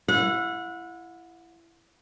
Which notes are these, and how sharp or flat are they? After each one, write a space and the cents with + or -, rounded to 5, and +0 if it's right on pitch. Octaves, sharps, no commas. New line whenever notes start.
E4 +25 F#5 -30